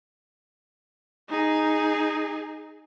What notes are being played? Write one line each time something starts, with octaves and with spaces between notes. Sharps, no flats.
D#4 G#4